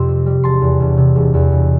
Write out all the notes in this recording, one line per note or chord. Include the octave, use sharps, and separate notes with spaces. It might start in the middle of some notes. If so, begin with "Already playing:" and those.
Already playing: F2 C3 G3 C6 E6
C4
G3
E1 A5 C6
E2
E1
C3
E1
E2
E1